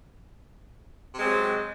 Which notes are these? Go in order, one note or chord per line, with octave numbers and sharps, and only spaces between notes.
C3 F#3 G#3 C4